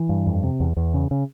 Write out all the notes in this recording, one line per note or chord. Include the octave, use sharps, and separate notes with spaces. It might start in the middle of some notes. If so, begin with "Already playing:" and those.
Already playing: E3
G2
F2
C3
E2
E2
C#3
C#3